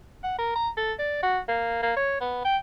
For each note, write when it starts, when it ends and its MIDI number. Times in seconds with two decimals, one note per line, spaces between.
0.24 0.38 78
0.38 0.54 70
0.55 0.69 82
0.77 0.93 69
0.99 1.23 74
1.23 1.39 66
1.48 1.82 58
1.82 1.95 58
1.96 2.20 73
2.21 2.41 59
2.44 2.57 79